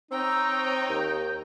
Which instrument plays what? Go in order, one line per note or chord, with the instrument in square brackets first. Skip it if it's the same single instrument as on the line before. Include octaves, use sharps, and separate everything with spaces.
[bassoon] C4 [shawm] D#4 [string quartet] C#5 G5 A#5 [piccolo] E6
[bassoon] D#2 [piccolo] G6